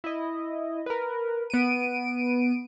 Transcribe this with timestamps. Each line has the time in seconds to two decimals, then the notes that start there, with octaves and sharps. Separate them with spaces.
0.04 E4 D#5
0.86 A#4 B4
1.50 B3 D7 D#7